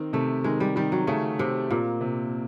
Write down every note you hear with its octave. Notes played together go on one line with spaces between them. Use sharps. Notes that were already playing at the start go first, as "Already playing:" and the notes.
Already playing: D#3 C4
C3 A3
D#3 G#3
G3
D#3 G3
F#3
C#3 A3
C3 C4
A#2 A#3
C3